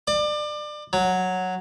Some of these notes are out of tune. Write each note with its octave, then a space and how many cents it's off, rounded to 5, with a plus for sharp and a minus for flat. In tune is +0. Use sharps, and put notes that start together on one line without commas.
D5 +30
F#3 -5